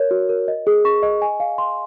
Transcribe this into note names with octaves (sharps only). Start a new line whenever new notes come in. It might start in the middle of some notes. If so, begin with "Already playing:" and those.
Already playing: A#4 C#5
F#4
A#4
D#5
G#4
C#6
D#5
G#5
F5
C6